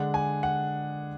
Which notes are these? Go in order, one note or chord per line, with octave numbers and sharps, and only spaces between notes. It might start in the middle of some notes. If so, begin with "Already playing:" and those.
Already playing: D3 G#3 D4 F#5
G#5
F#5